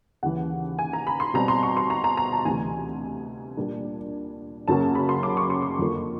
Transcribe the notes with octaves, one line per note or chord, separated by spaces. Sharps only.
D#2 C#3 E3 F#5
G#5
A#5
B5
C6
B2 G3 C4 A#5
C6
C#6
C6
A#5
A#5
A#5
A5
D2 C3 E3 G#5
A#2 G3 A#3 D4
F#2 C#3 F#3 A#3 C#4 A5
B5
C6
D6
C#6
C6
C#6
F2 D3 F3 A#3